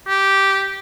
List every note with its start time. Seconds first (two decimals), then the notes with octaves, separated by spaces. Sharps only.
0.08 G4